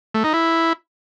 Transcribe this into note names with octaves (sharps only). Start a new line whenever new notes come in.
A3
D#4
E4